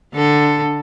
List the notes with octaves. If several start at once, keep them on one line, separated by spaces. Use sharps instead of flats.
D3 A4